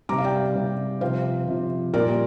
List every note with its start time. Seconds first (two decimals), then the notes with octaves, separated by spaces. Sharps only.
0.09 C3 G3 A#5 D6
0.18 F5
0.24 D5 G5
0.55 C3 G3
1.01 C3 F3 C5 F5
1.47 C3 F3
1.94 A#2 G3 A#4 D5